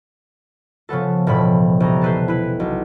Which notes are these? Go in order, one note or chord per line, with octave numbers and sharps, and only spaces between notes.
C#3 F3 B3 A4
E1 A2 F3 B5
C2 A#5
A4 B4 C5
E4 B4
B1